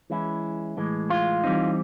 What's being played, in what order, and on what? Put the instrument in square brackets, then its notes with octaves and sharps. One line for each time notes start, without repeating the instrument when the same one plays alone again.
[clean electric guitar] E3 G#3 C#4 E4
A2 E3 G#3
F4
E3 G3 C4 D#4